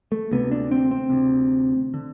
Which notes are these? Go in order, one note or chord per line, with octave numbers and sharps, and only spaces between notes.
A3
D2 C3 B3
D4
C4
C4
D2 C3
D3